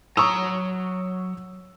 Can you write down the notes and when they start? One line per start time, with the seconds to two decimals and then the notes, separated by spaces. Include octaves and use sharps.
0.17 F#3 A#5 C#6 D#6 E6